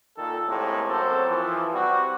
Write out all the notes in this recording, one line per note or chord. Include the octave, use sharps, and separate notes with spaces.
A#2 D#3 A4
A2 C3 G#3 A#3
F#2 C4 A4 C5
E3 F3
G3 C4 F#4